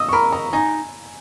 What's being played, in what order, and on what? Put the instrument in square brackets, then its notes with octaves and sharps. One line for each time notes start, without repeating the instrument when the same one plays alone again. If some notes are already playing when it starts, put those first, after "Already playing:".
Already playing: [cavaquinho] D#5 [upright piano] D#6 E6
[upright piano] C#6
[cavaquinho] A#4 [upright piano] B5
[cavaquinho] D#5 [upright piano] A#5
[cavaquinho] D#4 [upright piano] G#5